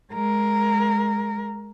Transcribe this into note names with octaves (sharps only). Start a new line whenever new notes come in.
G#3 A#4